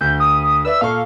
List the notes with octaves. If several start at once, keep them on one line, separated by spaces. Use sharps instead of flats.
D2 G6
D#6
B4 D5 E5 E6
A#2 A4 F5 C#6